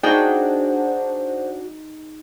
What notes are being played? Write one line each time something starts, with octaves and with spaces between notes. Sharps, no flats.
D4 D#4 F#4 G#4 C5 G5